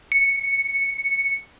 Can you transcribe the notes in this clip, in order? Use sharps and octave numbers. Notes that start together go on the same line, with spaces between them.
C#7